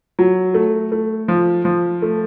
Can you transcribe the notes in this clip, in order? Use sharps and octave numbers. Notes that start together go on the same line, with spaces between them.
F#3
A3
A3
F3
F3
A3